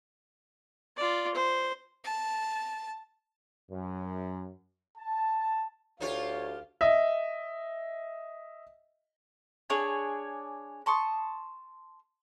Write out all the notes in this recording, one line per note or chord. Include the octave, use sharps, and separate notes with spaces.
F4 D5
C5
A5
F#2
A5
D2 D#4 F4 G4 C#5 F5
D#5 E5
D4 G#4 C#5 G#5
A5 C6 C#6 D#6